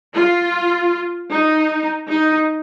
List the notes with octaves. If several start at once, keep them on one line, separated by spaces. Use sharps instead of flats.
F4
D#4
D#4